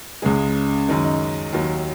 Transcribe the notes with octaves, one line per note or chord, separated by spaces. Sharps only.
C#2 C#3 G#3 G#4
F#2 D#3 G#3
D#4
D#2 D#3 F#3